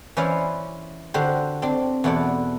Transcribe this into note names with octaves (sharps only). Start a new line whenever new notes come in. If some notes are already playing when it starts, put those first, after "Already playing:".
E3 C#4 E4 C5 D5 F5
D3 D4 F#4 G4 C5
C4 D4
E2 B2 E4 A4 D5 F#5